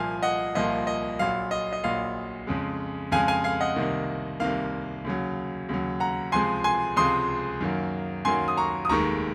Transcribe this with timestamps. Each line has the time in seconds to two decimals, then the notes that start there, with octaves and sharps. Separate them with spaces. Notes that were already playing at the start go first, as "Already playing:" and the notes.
Already playing: C2 A#2 F3 A#3 F5 G#5
0.22 D#5 F#5
0.55 C2 A#2 F3 A#3 D#5
0.87 D#5
1.19 A#1 A#2 F#3 F5
1.51 D#5
1.73 D#5
1.84 A#1 A#2 F#3 F5
2.47 F2 C#3 G#3
3.12 F2 C#3 G#3 F5 G#5
3.28 F5 G#5
3.44 F5 G#5
3.60 D#5 F#5
3.76 C2 C3 D#3 A#3
4.40 C2 C3 D#3 A#3 F5
5.05 D#2 C#3 F#3
5.69 D#2 C#3 F#3
6.00 F#5 A#5
6.32 C#2 C3 F3 G#3 G#5 C6
6.64 G#5 C6
6.96 C#2 C3 F3 G#3 C6 D#6
7.61 F#2 D#3 F#3 A#3
8.25 F#2 D#3 F#3 A#3 G#5 C6
8.48 D#6
8.57 A#5 C#6
8.85 D#6
8.89 F1 D#2 D#3 G#3 A#5 C#6